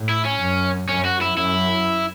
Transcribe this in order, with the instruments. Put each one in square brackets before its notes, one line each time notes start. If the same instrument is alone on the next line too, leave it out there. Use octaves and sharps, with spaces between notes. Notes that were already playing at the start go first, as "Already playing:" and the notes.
Already playing: [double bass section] A2
[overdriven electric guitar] E4
C#4
[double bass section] F#2
[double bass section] F#2 [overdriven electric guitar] C#4
[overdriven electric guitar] F#4
E4
[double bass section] F#2 [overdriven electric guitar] E4